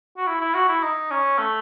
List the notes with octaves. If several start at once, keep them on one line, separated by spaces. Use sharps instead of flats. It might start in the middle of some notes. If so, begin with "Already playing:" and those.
F#4
E4
E4
F#4
E4
D#4
C#4
A3